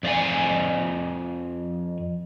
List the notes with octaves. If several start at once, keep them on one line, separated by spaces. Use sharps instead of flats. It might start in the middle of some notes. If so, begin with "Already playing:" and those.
F2 D5 F5 G#5